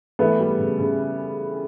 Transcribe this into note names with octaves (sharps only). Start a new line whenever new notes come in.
E3 A3 B3
G3
C#3
C#3